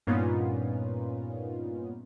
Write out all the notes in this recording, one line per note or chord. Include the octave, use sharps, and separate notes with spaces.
G2 A#2 B3 C#4 D#4 F4